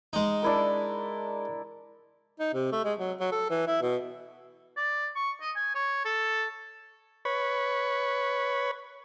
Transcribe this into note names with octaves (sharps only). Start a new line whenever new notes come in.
G#3 D#4
D4 E4 A#4
D#4
C3
A3
G#3
F#3
F#3
A4
E3
E4
B2
D5
C#6
D#5
G#5
C#5
A4
B4 C#5